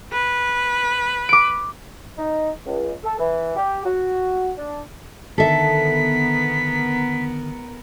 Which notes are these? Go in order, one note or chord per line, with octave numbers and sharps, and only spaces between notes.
B4
D6 D7
D#4
C#2
A4
E3
G4
F#4
D4
D3 D#3 B3 A4 A#4 E5 B6